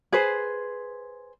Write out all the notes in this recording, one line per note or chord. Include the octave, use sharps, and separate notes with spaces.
G#4 B4 C5